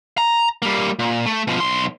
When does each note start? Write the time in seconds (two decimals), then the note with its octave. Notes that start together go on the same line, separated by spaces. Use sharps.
0.18 A#5
0.62 G3 A#3
0.99 A#2
1.26 A3
1.47 B2 F3
1.60 B1 C6